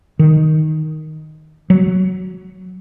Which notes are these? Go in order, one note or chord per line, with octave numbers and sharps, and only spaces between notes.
D#3
F#3